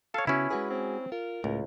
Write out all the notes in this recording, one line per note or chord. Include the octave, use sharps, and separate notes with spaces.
A4 C#5 F5
C#3 B3 C#4 E4 F#4
G#3 F#4 G#4 B4
C4
F4 A#4
C#2 A2